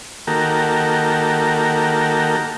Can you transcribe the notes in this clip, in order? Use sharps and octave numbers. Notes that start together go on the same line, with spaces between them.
D#3 A#3 F#4 G4 A4 A#4